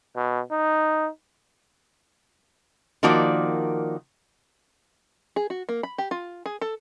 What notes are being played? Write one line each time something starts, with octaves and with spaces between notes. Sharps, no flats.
B2
D#4
D#3 F3 A#3 F#4 D5
G#4
F#4
A#3
B5
G4
F4
G#4
A4